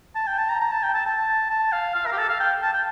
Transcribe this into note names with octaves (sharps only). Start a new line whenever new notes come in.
A5
G5
A5
A#5
A#5
A5
G5
A5
A5
A5
F5
F5
A#4
G4
A4
F5
G5
A5
G5